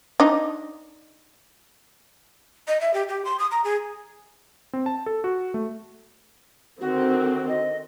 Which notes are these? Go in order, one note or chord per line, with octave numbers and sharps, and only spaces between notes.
D4 D#4
D#5
E5
G4
G4
C6
D#6
A#5
G#4
C4
A5
A4
F#4
A3
D3 D#3 C4 F#4
D#5